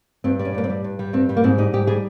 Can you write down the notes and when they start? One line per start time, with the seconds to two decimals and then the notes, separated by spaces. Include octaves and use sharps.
0.24 G2 C4
0.39 G3
0.45 C#4
0.54 G2 A#3
0.64 C4
0.70 G3
0.84 G2
0.99 G3
1.13 G2 C4
1.29 G3
1.37 A#3
1.44 G#2 C4
1.58 G3 D#4
1.73 G#2 G4
1.87 G3 G#4